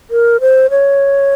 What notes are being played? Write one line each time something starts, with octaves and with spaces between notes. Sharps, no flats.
A#4
C5
C#5